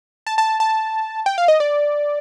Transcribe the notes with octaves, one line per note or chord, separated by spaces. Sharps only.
A5
A5
A5
G5
F5
D#5
D5